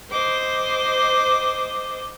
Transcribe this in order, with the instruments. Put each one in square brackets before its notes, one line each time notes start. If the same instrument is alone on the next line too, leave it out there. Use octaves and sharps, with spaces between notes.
[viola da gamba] C5 [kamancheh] D#5 D6